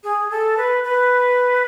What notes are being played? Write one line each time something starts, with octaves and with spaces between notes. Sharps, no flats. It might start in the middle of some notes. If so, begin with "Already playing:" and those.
G#4
A4
B4
B4